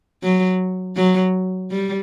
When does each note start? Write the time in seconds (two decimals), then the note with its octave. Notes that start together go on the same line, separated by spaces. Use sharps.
0.23 F#3
0.96 F#3
1.71 G3